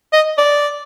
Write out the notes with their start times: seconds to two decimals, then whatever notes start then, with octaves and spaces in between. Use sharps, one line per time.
0.13 D#5
0.38 D5